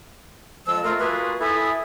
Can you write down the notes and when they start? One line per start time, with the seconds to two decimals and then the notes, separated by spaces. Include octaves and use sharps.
0.67 F2 F3 G#3 E6
0.84 A3 F4 A#4
0.99 A#3 F4 F#4 G#4 B4
1.41 E4 A4 E5 G#5 B5 D#6